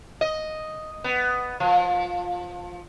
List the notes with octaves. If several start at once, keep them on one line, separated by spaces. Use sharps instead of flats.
D#5
B3
F3